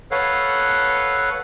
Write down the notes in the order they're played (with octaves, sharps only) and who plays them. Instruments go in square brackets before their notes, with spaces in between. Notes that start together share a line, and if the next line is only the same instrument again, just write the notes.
[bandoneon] A4 B4 C#5 F5 F#5